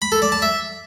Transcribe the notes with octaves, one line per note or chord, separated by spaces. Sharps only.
B5
A4
D5
A5
E5